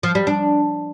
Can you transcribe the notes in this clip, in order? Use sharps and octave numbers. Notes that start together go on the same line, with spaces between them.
F3
G3
D4